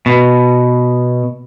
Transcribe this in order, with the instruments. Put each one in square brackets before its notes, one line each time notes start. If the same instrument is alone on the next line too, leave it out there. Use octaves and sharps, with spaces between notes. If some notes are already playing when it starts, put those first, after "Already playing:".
[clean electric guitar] B2